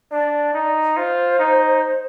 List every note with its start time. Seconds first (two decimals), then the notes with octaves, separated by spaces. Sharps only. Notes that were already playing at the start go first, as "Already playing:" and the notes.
0.11 D4 D5
0.54 D#4
0.97 F4 C5
1.39 D#4